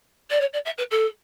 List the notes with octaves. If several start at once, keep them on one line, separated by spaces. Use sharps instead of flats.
D5
C#5
D5
E5
B4
A4